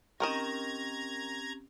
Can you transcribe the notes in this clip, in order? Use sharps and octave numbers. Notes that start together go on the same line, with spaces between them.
D#3 C4 C#4 G4 A#4 D#5 A#5 G#6